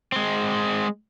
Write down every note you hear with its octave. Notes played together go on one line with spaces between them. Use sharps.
G#3 C4